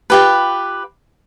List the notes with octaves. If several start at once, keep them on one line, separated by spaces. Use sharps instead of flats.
F4 G4 B4